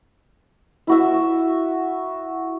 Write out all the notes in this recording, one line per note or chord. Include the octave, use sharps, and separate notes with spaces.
E4 F#4 E5